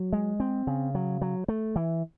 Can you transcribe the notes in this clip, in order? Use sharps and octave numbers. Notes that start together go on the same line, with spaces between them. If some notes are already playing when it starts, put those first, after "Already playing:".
Already playing: F#3
G#3
C4
C#3
F#3
F#3
A3
E3